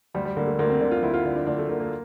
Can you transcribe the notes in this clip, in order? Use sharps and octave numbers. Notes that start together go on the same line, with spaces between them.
D2 G3
G3
D3 A#3
A3
D2 A#3
C4
D3 D4
F4
D2 E4
F4
D3
D4
D2 D4
A3
D3 A#3
A#3